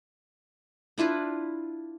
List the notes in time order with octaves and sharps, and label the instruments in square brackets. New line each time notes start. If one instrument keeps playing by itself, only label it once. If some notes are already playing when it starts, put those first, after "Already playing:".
[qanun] D4 E4 F4 B4